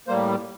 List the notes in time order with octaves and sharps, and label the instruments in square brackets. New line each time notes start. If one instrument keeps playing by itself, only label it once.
[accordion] A2 G3 A#3 C5